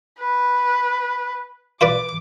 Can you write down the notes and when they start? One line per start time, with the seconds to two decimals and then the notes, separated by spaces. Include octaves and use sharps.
0.19 B4
1.81 F4 B4 D5 D6